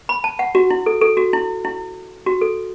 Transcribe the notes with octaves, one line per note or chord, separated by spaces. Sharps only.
B5
A5
F#5
F#4
E4
A4
A4
F#4
E4
E4
F#4
A4